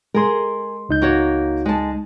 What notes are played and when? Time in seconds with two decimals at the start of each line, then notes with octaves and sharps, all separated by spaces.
0.15 G#3 G#4 A#4 C6
0.89 C#2 D#4 G6
1.02 A#3 F#4 C#5
1.65 G#3 A5